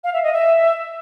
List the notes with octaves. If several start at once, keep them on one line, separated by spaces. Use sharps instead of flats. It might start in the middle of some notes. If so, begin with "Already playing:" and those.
F5
E5
D#5
E5